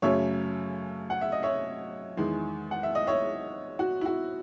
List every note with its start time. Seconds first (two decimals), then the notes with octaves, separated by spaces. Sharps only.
0.02 F#2 C#3 F#3 A3 C#5 E5
1.10 F#5
1.21 E5
1.32 D#5
1.43 C#5 E5
2.17 E2 D#3 G#3
2.71 F#5
2.83 E5
2.95 D#5
3.07 C#5 E5
3.79 F#4
4.01 E4
4.06 F#4